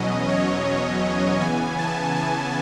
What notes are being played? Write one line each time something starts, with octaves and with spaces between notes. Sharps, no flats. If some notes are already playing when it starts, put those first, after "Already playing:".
Already playing: E2 B2 F#3 C#4 D#5
C#5
C#3 E3 B3 G#5
A5
G#5